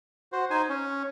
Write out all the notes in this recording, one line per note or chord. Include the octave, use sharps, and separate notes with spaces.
F#4 C5
D#4 C5 G#5
C#4